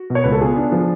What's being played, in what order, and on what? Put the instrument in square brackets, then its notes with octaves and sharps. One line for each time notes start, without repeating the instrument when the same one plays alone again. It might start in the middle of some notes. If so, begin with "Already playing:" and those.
Already playing: [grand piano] F#4
B2
C#5
C#2 B4
A4
B3 F4 G#4
D4
F3